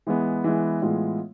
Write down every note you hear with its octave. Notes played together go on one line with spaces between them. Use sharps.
E3 G#3 B3
E3 G#3 B3
A2 E3 G#3 B3 F4